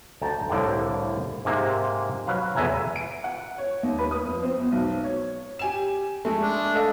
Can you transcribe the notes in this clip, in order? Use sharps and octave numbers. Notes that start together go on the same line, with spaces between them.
D2 G5 A5 A#5
C2 A2 D3 A#3 G5
G#2 C3 A#3
F#3 B4 F5
E2 A2 E5 G#5 A#5
D7
F#5
C#5
D#2
B4
D#6
F2
C4
E2
B1
C#5
G4 G#5 E7
G#3 A3
D4
A4 D#5 F5